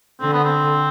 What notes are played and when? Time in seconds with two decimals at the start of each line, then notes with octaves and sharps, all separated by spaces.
0.21 D3 C4
0.33 B3
0.45 C4